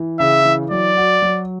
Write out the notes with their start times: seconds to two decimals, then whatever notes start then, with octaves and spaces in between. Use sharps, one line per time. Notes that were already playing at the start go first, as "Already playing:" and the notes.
Already playing: E3
0.20 C#3 E5
0.45 E3
0.71 F#3 D5
0.97 F#4
1.22 F#3